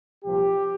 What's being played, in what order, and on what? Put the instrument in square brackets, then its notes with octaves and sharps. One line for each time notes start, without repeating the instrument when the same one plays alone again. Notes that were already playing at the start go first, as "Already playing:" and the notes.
[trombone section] C2 A#2 F3 G4